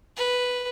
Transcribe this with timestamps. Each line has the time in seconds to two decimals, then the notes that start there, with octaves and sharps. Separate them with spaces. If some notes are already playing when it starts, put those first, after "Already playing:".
0.17 B4